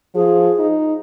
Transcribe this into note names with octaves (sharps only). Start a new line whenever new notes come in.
F3 G#4
D#4